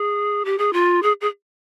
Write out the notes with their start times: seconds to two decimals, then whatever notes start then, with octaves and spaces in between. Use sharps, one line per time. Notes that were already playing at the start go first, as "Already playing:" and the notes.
Already playing: G#4
0.45 G4
0.58 G#4
0.73 F4
1.02 G#4
1.21 G#4